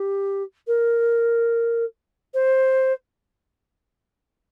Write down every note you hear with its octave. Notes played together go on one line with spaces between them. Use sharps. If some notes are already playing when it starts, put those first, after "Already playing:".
Already playing: G4
A#4
C5